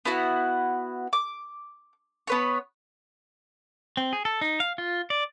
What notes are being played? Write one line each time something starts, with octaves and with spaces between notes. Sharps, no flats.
B3 E4 F#4 F#5
D6
B3 B4 C#5
C4
G#4
A4
D#4
F5
F4
D5